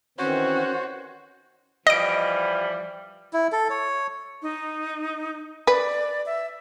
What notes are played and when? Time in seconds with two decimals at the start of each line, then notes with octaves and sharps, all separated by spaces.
0.18 D#3 E3 C4 C#4 F#4 C5 C#5
1.87 E3 F3 G3 D#5 D7
3.33 E4
3.52 A4
3.70 C#5
4.42 D#4
5.67 B4 D5
6.26 E5